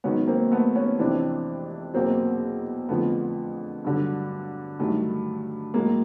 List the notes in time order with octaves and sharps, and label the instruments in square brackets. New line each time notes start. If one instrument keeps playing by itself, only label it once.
[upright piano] G#2 D#3 F#3 B3 C#4
A#3 C4
A3 B3
B3 C#4
F2 C3 E3 C4 D4
E2 B2 F#3 A#3 C4
F2 D3 F3 A3 B3
G2 D3 F#3
G2 D#3 F#3 A3
A2 F#3 G#3 A#3